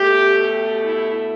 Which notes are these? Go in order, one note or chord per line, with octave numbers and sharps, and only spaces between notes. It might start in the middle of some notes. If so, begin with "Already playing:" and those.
Already playing: B2 A3 G4
E4